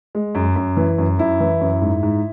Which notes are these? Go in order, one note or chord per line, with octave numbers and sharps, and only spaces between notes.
G#3
F#2
F#2
E3
F#2
F#2 E4
E3
F#2
G#2
G#2